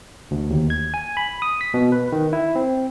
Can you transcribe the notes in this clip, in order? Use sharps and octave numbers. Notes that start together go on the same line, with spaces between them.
D2
D#2
G#6
G#5
B5
D#6
B6
B2
B4
D#3
E4
C4